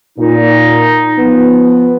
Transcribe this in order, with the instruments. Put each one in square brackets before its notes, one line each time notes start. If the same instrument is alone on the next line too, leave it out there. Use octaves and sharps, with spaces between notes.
[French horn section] A#2 [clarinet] D#4
[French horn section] F3 B3